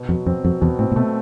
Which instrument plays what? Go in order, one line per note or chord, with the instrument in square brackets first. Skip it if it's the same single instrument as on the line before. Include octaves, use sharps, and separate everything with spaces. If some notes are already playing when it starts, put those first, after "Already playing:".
Already playing: [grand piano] B2
[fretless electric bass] F2 [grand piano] F#3
[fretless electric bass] F2 [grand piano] C4
[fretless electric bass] F2 [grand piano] F#3
[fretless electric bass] E2 [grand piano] B2
[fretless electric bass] A2 [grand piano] C4
[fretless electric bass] A#2
[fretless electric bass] B2 [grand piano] A3